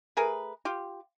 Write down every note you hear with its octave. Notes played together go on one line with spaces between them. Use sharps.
A3 G#4 A#4 B4
F4 G4